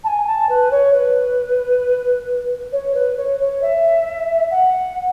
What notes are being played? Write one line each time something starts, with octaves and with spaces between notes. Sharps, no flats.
A5
G#5
A5
B4
C#5
B4
C#5
B4
C#5
C#5
E5
F#5